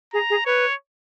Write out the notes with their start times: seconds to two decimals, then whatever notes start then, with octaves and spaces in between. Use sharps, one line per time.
0.13 G#4 A#5
0.30 G#4
0.45 B4 C#5